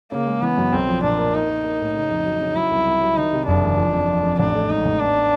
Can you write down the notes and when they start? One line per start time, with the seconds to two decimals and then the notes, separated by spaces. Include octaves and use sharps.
0.12 C#3 A#3
0.27 G#3
0.42 E3 B3
0.58 F#2
0.73 B1 C4
0.88 F3
1.03 A#2 D4
1.19 A#3
1.34 A#3 D#4
1.49 A#3
1.64 A#3
1.80 A2
1.94 C#3
2.10 F2
2.25 F#3
2.41 C#3
2.56 F#3 E4
2.71 C2
2.86 C2
3.01 F#3
3.17 D#3 D#4
3.33 C3
3.47 F#1 D4
3.63 E2
3.78 F3
3.93 F2
4.08 F3
4.23 F2
4.39 A1 D4
4.55 A3
4.70 G#2 D#4
4.85 A1
5.00 B3 D4
5.16 B3